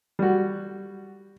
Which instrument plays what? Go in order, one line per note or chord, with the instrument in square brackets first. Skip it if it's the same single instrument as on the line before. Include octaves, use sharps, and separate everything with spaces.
[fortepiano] G3 F#4